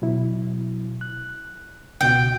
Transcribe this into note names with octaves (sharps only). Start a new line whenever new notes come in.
B2 F#3 E4
F#6
C#2 B2 F#4 G5